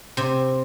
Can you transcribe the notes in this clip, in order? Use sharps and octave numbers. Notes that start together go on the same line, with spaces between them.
C3 C4